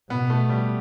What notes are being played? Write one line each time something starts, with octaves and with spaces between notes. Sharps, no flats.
B2 B3
A3
G3